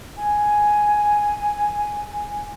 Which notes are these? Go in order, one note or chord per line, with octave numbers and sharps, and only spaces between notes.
G#5